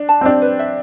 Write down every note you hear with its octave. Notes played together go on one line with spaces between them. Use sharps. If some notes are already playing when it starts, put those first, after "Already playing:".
Already playing: D4
A5
C4
D4 G4
B4
E5